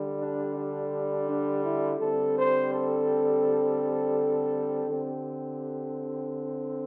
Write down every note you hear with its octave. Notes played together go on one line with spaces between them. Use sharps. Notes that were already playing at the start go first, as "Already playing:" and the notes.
Already playing: D3 G3
D4
D4
D4
E4
D3 G3 C4 A4
C5
A4
D3 C4 G4